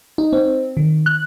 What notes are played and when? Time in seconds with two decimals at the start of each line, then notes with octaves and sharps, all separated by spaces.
0.18 D#4
0.33 C4
0.77 D#3
1.06 F#6